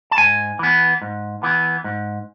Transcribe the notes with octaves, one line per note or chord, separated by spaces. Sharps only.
A5
G#2 G#5
E3 B3
G#2
E3 B3
G#2